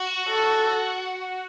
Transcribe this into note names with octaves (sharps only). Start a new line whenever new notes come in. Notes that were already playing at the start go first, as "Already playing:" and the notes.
Already playing: F#4
A4